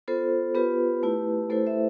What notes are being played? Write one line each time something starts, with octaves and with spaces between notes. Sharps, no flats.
B3 F4 A4 C5
B3 F4 G4 B4
A3 E4
A3 E4 A4 C5
C5 E5